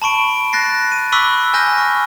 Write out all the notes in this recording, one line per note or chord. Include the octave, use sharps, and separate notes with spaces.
A5 B5 C#6 D7
F#6 A6 A#6 C7
D#7
B5 C#6 D6 E6 F#6 B6
G#5 F6 G6 A#6 D#7 G7
C#6